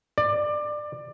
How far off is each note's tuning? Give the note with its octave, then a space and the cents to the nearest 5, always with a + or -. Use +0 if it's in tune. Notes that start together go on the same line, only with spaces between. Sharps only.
D5 +20